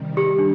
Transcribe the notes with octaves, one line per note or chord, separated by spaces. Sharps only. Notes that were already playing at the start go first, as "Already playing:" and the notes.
Already playing: C3 D#3 G3
G4
D4